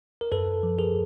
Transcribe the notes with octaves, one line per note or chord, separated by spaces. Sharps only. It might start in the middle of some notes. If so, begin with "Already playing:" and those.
A#4
F#2 A4 B4
F3
G#4 A#4